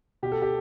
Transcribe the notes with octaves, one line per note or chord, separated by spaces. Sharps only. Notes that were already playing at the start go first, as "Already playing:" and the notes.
B2 G4
A4
G4